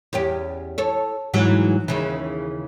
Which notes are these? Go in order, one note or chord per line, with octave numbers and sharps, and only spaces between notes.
E2 C#4 G4
A4 C#5
G#2 E3 F#3
D#2 C#3 E3